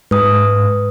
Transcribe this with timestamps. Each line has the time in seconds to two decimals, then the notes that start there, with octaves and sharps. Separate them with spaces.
0.11 G#2 B4 D#6